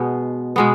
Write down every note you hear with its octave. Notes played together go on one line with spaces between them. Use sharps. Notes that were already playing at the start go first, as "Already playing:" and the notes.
Already playing: B2 G#3 B3
B2 G#3 B3